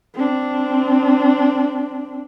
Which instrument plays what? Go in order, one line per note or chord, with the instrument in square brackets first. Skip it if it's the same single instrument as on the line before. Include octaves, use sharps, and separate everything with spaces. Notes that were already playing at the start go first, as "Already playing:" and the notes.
[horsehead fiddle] C4 D4